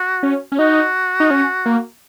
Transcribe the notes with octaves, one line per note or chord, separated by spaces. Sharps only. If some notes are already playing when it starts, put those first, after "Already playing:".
Already playing: F#4
C#4
C#4
D#4 F#4
D#4
C#4
A#3